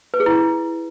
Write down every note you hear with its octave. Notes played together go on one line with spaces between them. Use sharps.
B4
G#4
E4